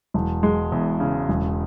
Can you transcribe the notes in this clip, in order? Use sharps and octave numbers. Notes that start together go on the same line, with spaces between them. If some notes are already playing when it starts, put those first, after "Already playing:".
E1
G#3
E2
C#3
E1